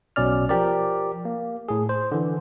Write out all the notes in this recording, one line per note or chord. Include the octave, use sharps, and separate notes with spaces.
B1 B2 C#4 D5 F6
F3 G4 A#4 D5
A#3
A2 G#4
C5
D3 E3